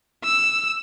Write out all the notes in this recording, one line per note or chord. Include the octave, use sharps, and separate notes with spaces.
E6